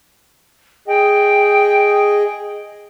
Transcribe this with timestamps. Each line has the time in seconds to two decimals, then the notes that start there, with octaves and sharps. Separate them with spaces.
0.88 G#4 D#5 G5